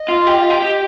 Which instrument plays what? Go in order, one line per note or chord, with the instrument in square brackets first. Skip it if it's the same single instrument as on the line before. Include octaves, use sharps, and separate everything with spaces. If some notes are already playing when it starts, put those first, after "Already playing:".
Already playing: [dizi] D#5
[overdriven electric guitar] F4
G4
F4
G4
G4